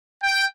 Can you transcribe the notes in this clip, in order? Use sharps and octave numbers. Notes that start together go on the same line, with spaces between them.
G5